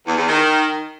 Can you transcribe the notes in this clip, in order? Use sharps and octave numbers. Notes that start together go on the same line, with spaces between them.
E2
E2
D#3